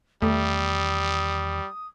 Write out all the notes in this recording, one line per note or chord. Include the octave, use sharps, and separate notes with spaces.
E2 D#3 G3 A3 D#6